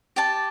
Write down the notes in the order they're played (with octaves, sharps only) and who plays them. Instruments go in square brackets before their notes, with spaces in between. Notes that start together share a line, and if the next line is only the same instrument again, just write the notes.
[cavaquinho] G4 D5 A5